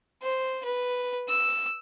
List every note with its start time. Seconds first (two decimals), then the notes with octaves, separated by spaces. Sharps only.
0.23 C5
0.65 B4
1.28 E6